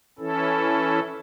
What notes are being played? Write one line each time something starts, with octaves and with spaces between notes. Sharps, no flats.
E3 C#4 E4 A4